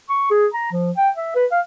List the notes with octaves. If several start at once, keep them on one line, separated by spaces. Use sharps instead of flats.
C#6
G#4
A#5
F3
G5
E5
B4
F5